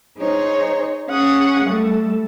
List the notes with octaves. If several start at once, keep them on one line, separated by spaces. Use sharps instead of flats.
D#4 G#4 C5 C#5
C#4 G#4 F#5 C#6 D#6
G3 A3 A4